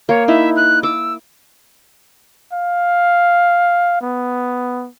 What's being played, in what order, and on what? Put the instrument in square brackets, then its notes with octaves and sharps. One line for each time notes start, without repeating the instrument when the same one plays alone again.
[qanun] A#3 [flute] C#5
[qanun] D#4 E4 [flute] E5
[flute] F#6
[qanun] D6 [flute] E6
[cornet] F5
B3